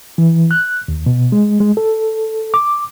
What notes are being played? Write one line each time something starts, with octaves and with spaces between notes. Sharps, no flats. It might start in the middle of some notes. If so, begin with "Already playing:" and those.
E3
F#6
D#2
B2
G#3
G#3
A4
D6